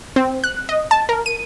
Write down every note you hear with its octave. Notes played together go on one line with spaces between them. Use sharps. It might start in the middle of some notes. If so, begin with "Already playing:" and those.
C4
F#6
D#5
A5
A#4
D#7